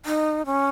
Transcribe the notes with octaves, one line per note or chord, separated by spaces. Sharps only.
D#4
C#4